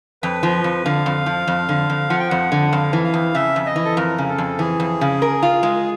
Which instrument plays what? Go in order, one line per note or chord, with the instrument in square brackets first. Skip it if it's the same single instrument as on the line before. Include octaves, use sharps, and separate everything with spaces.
[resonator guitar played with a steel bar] F2 [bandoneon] B4
[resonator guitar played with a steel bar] F3
F2
[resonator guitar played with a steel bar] D3 [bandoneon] F5
[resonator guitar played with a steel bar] F2
F3
F2
D3
F2
[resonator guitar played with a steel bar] F3 [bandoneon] F#5
[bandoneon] G5
[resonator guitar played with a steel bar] F2 [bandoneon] F#5
[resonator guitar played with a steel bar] D3
[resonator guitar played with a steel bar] F2 [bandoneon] F5
[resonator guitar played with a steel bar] E3
[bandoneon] F5
[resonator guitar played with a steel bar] F2
[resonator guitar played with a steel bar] C#3 [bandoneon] E5
[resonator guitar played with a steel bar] F2
[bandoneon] D#5
[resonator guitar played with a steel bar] E3
[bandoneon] A4
[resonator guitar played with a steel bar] F2 [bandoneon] A#4
[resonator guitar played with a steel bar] C#3
[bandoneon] A4
[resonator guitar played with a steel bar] F2
[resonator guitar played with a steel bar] E3 [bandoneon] G#4
[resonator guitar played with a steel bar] F2
C#3
A#4
F4
G#3